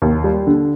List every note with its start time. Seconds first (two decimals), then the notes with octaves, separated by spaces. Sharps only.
0.02 D#2
0.24 G3
0.47 D3